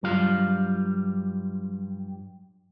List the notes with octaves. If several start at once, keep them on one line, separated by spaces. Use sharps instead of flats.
G2 F#3 G3 F4 F5